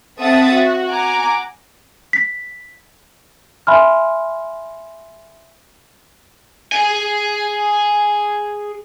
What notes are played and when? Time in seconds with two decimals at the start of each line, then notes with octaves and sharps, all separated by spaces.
0.20 C4 A4 E5 F#5 D#6 A6
0.52 F#4
0.88 F#5 G#5 A#5 D6
2.13 B6
3.67 E5 G#5 B5 C6 F6
6.72 G#4 G#5